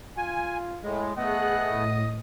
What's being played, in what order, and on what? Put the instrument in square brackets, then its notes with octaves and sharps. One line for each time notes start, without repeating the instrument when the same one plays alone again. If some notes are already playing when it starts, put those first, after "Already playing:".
[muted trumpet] F4 [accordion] G#5
[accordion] A2 G#3
[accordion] A3 B3 [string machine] G#4 F#6 [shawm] D#5 [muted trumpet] F#5
[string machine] A2 D#6